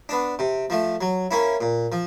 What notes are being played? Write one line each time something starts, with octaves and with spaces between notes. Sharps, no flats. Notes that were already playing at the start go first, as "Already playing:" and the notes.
B3 D4
C3
F3 A3
F#3
A#3 C#4 E4
A#2
F3